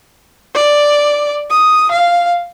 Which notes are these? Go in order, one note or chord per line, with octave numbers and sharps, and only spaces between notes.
D5
D#6
F5